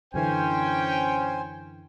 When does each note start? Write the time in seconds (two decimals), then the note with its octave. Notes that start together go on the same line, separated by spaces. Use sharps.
0.14 F#2 D3 E3 C#4 C5 G5 G#5